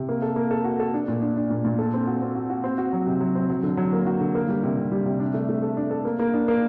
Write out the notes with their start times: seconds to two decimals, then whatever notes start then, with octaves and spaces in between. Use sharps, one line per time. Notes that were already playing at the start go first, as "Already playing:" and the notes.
Already playing: C3
0.09 A#3
0.22 A4
0.36 A#3
0.51 A4
0.64 F#4
0.80 A4
0.94 D4
1.08 A#2
1.22 D4
1.37 D4
1.50 A#2
1.65 A#2
1.79 A4
1.94 C4
2.07 F#4
2.22 C4
2.35 F#4
2.50 F#4
2.64 C4
2.78 F#4
2.93 F#3
3.06 C3
3.21 F#3
3.35 C4
3.50 F#3
3.63 D3
3.77 F#3
3.93 A#3
4.06 F#4
4.20 D3
4.35 A#3
4.49 G3
4.64 C3
4.77 C3
4.92 G3
5.06 C3
5.20 D4
5.34 A3
5.49 A3
5.62 A4
5.77 D4
5.91 A4
6.05 A#3
6.19 A#3
6.34 D4
6.48 A#3